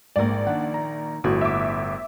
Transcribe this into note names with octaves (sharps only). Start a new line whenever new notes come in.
A#1 G#2 A#4 D5
D#3 D4 F#5
A#5
G1 A2 F#4
E5 D6